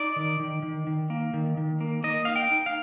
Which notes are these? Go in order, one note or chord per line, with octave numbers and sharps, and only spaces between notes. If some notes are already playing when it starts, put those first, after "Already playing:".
Already playing: D#4 D5
D#3
D#3
D#3
D#3
A#3
D#3
D#3
A#3
A#3 D#5
D#4 F5
G5
D#4
F5